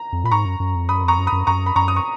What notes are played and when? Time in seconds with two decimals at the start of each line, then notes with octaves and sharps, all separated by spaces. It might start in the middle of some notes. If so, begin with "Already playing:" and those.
Already playing: A#5
0.13 F2
0.24 A#2 B5
0.31 G#2 A#5 C#6
0.45 F#2
0.60 F#2
0.75 F2
0.89 F#2 B5 D#6
1.04 F2 A#5 C#6
1.18 F#2
1.27 B5 D#6
1.32 F#2
1.47 F#2 A#5 C#6
1.66 B5
1.76 F#2 A#5 C#6
1.88 D#6
1.96 C#6